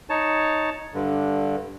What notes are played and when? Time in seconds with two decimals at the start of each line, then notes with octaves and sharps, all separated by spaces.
0.09 D#4 C#5 A5
0.94 G2 D3